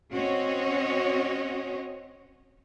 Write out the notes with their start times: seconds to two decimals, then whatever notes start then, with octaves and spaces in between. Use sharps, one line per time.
0.11 C4 C#4 F#4 C#5 D#5